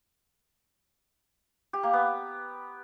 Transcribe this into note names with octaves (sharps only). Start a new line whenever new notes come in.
G4
A#3
B3